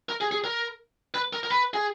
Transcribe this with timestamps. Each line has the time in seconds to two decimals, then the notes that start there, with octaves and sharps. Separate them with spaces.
0.09 A#4
0.21 G#4
0.32 G#4
0.44 A#4
1.14 B4
1.33 A#4
1.43 A#4
1.50 B4
1.74 G#4